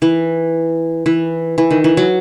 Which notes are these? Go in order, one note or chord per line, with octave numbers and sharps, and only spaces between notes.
E3
E3
E3
D#3
E3
F#3